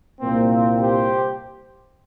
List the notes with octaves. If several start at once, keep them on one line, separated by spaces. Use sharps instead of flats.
C2 A#2 A#3 C4
C4
G4 C5